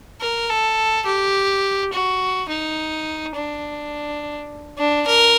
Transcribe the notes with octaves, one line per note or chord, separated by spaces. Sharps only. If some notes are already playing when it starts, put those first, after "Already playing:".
A#4
A4
G4
F#4
D#4
D4
D4
A#4